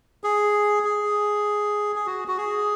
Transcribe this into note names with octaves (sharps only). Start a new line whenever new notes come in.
G#4
G#4
G#4
F#4
F#4
G#4